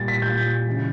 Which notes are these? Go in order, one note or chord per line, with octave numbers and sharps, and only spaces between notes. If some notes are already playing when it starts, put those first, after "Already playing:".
Already playing: A#2 G3 A6
B6
A#2 G3 G6
C#3 E3 G#3